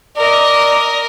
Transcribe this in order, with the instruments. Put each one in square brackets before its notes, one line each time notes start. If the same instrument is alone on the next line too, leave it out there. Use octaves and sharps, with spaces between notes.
[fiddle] A#4 D#5 [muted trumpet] D5